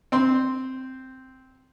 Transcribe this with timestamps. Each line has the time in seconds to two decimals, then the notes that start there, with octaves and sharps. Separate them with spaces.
0.12 C4 C6